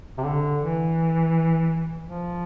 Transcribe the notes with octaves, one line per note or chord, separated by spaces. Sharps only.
C3
D3
E3
F3